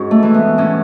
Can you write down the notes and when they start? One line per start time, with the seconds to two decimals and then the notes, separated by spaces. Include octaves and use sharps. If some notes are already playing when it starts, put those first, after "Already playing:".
Already playing: G#2 C#4 F#4
0.11 A3
0.23 E3
0.34 B3
0.58 A2 C#4